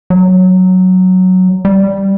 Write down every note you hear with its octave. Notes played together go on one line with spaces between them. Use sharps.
F#3
G3